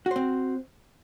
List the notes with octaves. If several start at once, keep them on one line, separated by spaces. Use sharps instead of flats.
C4 F#4 C5